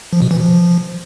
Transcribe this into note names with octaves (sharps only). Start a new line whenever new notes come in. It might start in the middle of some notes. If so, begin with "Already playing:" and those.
F3
B2
E3
F3